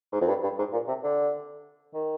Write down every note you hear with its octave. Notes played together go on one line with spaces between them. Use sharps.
G#2
F2
G2
G2
G#2
A#2
C3
D3
D#3